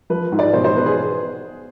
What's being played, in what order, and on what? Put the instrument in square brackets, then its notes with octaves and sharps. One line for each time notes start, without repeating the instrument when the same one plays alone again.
[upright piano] F3 B4
G#2
D5
B2 C5
C5
B2 B4
G#4